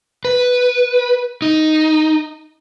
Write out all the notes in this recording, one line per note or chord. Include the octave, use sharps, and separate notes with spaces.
B4
D#4